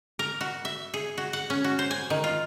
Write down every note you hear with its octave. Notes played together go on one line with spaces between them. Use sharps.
A#4
F#4
E5
G#4
F#4
F#5
C#4
F#4
C5
G#5
D#3
F4